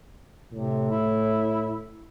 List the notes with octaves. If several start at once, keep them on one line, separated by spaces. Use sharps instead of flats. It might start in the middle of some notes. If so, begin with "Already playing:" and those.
A2 C3
E4